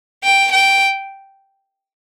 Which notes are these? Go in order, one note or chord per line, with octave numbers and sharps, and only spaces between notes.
G5
G5